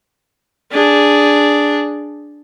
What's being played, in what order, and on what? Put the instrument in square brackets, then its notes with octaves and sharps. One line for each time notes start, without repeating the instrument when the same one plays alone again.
[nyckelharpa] D4 G#4